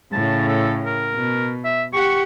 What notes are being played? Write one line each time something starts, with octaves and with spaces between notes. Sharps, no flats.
A2 C#3 A5
A4
A#4
B2
E5
G4 F#5 C#6